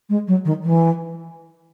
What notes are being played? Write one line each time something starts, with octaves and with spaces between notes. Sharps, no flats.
G#3
F#3
D#3
E3